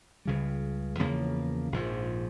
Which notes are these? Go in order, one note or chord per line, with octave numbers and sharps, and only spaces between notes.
C#2 C#3 G3
E2 C#3 F3 A#3
A#1 G#2 F3